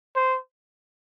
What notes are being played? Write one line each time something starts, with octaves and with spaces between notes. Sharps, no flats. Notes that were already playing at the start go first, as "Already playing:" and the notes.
C5